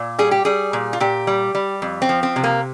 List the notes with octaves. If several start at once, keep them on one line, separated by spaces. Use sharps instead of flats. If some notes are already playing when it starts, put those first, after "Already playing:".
Already playing: A#2
G3 G#4
G4
G3 G#4
A#2
F4
A#2 G4
G3
G3
F2
C4
F3
C4
C3
A#3